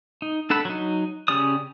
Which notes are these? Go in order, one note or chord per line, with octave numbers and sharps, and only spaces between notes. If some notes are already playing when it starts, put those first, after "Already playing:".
D#4
D4 A4 F#5 B5
F#3 D#4
C#3 C#4 G4 D5 D#6